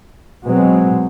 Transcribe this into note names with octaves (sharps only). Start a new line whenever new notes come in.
B2 F#3 G#3 B3 C4